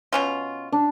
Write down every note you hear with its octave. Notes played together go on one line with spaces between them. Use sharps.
B2 C#4 F4
D4